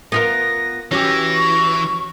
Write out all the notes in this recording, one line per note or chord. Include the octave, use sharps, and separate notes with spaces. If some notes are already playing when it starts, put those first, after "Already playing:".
B3 F4 A#4 A#6
E3 C#4 F#4 G4 A#6
C#6